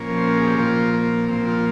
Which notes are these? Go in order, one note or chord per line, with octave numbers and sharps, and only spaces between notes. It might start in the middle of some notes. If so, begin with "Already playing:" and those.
Already playing: A#2 F3 A#3 C#4
C5
A#4
G#4
G4
A#2 F3 A#3 F4
A#3
A#2 F3 A#3 C4
F4